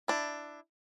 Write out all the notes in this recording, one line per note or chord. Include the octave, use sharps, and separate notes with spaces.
D4 E4